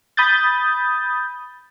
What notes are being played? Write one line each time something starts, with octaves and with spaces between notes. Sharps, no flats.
B5 D#6 G6 A6